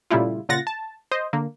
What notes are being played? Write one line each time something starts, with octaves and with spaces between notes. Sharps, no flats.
A#2 C#3 G3 A3 E4 F4
A#2 C#3 F4 F#5 A6 A#6
A5
C5 D#5
D3 A#3